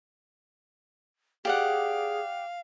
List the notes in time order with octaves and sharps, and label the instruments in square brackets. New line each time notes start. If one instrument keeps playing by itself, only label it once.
[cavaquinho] G4 D5 F#5 [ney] G#4 [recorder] F5